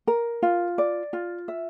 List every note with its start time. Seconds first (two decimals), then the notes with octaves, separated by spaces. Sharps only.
0.07 A#4
0.42 F4
0.78 D5
1.13 F4
1.48 E5